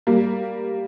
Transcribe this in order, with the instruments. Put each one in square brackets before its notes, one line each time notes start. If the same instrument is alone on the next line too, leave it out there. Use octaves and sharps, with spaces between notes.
[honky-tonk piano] G3 A#3